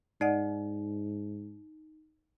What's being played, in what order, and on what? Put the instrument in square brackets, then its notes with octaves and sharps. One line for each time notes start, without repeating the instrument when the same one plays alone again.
[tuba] G#2 [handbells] D#4 [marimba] D5 D#5 F#5